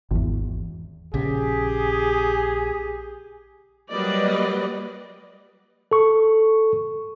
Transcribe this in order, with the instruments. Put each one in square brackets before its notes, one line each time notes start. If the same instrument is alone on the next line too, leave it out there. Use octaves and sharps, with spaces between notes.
[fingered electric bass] G#1 E2
[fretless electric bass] A#1 C#3 [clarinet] G4 [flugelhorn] G#4
[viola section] F#3 G3 A#3 B4 D5 D#5
[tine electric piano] A4 C#6